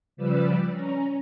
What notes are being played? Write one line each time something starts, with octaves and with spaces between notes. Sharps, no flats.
C#3 F3 G3 B4 D5 E6
C#4 A#5